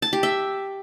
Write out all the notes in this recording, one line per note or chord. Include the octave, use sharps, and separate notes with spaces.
A5
G4
E5